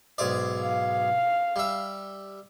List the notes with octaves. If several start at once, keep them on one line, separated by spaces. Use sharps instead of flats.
B1 G#2 D5
F5
G3 E5